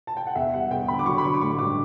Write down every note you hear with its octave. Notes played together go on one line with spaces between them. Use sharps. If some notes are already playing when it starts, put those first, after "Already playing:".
A5
G5
F#5
E2 E5
G3 F#5
E2 G5
D3 B5
D6
F#3 C#6
B5
D3 C#6
D6
A1 C#6
G2 D6